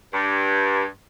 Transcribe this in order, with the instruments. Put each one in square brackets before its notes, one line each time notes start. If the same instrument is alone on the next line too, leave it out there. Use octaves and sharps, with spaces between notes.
[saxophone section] G2